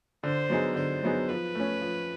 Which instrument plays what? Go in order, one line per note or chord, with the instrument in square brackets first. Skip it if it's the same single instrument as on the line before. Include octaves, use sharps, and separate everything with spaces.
[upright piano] D3 [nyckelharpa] C5
[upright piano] F#3 B3 D#4 G#4
[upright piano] D3 [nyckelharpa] C5
[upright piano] F#3 B3 D#4 G#4
[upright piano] F3 [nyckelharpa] B4
[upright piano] A3 C#4
F3